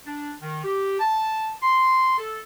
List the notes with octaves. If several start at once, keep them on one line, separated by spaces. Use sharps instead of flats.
D4
D#3
G4
A5
C6
A4